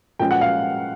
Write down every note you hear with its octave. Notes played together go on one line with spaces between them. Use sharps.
A#2 F3 G#3 C#4 G5
F#5
F5